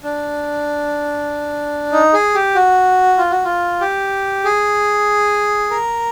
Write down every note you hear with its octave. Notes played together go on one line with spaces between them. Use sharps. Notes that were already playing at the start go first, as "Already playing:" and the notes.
D4
D#4
G#4
G4
F#4
F4
F#4
F4
G4
G#4
A#4